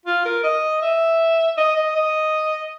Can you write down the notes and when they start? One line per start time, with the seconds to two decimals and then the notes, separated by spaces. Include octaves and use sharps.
0.06 F4
0.25 A#4
0.44 D#5
0.82 E5
1.57 D#5
1.76 D#5
1.95 D#5